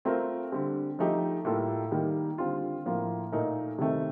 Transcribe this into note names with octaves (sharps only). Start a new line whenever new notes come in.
A3 C4 F4 A#4
D3 G3 C4
F3 A3 D#4 G4
A2 G3 A#3 F4 A4
D#3 G3 A#3 D#4
D3 G3 C4 F4
A2 F3 A#3 F4
A#2 A3 D#4 A#4
C3 D#3 A3 C4